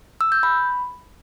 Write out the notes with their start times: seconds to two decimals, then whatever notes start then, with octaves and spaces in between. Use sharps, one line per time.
0.21 E6
0.32 G6
0.43 B5